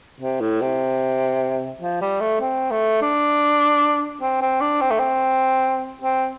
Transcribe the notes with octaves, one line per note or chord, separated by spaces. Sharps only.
C3
A2
C3
F3
G3
A3
C4
A3
D4
C4
C4
D4
C4
A3
C4
C4